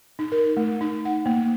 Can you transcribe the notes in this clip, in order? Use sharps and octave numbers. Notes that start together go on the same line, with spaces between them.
D#4
A#4
A3
D#4
F#5
A#3